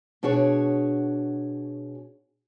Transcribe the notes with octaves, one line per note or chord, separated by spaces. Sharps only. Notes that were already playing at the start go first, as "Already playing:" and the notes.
B2 D4 F#4 G#4 C#5